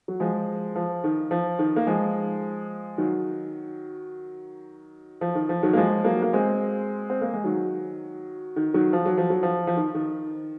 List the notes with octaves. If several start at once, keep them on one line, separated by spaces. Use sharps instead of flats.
F#3
F3 G#3
F3
D#3
F3
D#3
A#3
F3 G#3
D#3 F#3
F3
D#3
F3
D#3 F#3
A#3
F3 G#3
F#3 A#3
A#3
G#3 C4
C4
A#3
G#3
D#3 F#3
D#3
D#3 F#3
F3
F#3
F3
F#3
F3
F3
D#3
D#3